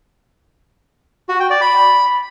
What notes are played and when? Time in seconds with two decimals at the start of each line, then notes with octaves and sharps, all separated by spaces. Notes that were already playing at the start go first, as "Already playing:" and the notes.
1.29 F#4
1.40 G5
1.50 D5
1.61 B5